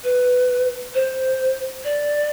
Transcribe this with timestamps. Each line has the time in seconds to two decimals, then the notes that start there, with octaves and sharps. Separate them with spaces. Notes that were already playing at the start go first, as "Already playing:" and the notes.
0.04 B4
0.94 C5
1.84 D5